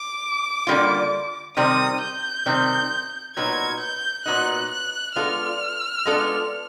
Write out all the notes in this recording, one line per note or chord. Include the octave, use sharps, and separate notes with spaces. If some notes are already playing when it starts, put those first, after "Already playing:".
Already playing: D6
D3 G3 A#3 C#4 F4
C3 D#3 G3 C4 D#6
G6
C3 D#3 G3 C4
A#2 F#3 B3 D#4 G#6
G6
A#2 F#3 B3 D#4 F#6
F#6
G#3 B3 D4 F4 A4 F6
G#3 B3 D4 F4 A4